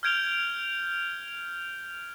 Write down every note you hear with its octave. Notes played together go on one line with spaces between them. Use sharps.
F6 G6 G#6 D7 F7 G7